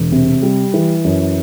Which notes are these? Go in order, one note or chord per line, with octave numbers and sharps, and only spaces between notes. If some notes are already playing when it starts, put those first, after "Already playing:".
Already playing: E1
C3
G3
E3
F#2